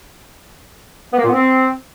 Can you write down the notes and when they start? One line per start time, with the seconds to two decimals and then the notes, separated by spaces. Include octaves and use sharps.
1.13 B3
1.18 A#3
1.23 A#2
1.28 B3
1.33 C4